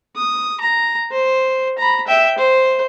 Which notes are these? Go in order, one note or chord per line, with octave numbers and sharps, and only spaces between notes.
D#6
A#5
C5
A#5 B5
E5 G5
C5